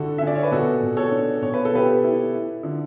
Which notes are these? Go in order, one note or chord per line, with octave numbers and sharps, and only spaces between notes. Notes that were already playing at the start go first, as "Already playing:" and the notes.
Already playing: D3 E4 F#4 A4
C#4 E5
D5
C#5
B4
B2 F#4 A4
B2
A4 C#5
D4
B2 C#5
B4
A4
B2 G4 B4
E4
E4
D3